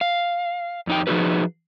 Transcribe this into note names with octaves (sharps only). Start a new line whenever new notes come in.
F5
F2 D#4 G5
F3 G#3 D#4 F#4 G#4 B4